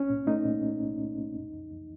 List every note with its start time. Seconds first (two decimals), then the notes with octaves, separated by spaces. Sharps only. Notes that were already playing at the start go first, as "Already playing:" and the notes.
Already playing: C2 C#4
0.10 A#2
0.27 A3 D#4
0.45 A#2
0.64 A3
0.81 C2
0.99 A#2
1.17 C2
1.35 F2
1.53 F2
1.71 F2